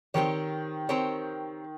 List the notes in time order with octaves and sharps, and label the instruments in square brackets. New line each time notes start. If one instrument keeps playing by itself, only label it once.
[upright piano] D#3 [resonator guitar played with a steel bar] C4 G4 A#4 C#5
[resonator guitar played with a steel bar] C4 G4 A#4 C#5